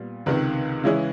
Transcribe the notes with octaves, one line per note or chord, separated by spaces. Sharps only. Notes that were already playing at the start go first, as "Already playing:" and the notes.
Already playing: A#2 G3 B3
C#2 C3 D#3 B4
C#3 E3 G#3 C#4 E4